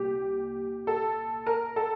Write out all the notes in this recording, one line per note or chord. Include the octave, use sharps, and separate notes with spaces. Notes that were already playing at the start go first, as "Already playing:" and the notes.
Already playing: C2 A#2 G4
A4
A#4
A4